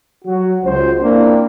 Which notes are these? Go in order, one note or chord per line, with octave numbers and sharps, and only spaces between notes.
F#3 F#4
C#2 C5
A#3 C4 D4 E4